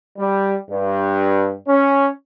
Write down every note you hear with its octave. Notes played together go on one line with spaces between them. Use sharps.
G3
G2
C#4